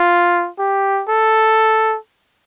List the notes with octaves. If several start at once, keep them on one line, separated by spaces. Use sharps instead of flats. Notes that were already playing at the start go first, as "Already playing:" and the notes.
Already playing: F4
G4
A4